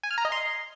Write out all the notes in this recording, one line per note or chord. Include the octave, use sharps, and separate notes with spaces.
G#5
F6
A#5
D#5
C6